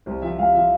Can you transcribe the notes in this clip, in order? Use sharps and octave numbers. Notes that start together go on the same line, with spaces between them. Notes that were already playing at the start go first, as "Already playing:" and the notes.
C2 C5
F3 E5
C2 F5
F3 E5